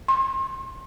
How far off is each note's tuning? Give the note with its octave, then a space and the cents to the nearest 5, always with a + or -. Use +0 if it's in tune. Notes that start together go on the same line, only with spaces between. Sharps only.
C6 +35